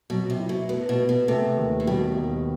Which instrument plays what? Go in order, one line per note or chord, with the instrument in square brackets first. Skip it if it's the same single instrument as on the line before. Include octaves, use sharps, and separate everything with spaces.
[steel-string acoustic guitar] B2 [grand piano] F#3
[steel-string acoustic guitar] C3
[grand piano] E4
[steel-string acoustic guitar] B2
[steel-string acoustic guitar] A2 [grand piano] B3
[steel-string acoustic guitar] B2
[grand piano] B3
[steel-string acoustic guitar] B2
[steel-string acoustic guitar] C3 [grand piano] A3
[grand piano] D#2
[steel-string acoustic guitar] A2
[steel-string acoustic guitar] B2 [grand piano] G3
[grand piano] D#2